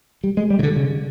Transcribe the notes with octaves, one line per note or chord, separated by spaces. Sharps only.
G3
G#3
G3
C#3
D3
C#3